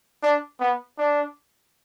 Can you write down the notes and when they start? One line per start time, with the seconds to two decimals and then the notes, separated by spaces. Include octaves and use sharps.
0.23 D4
0.60 B3
0.98 D4